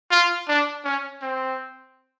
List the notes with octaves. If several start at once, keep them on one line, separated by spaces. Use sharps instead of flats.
F4
D4
C#4
C4